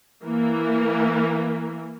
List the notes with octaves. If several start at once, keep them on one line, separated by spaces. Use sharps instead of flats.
E3 A#3